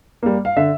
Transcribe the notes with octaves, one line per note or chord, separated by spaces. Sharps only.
G3 A#3
F5
D3 E5